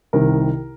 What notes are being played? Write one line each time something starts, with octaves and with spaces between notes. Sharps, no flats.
C2 C3 D#3 A#4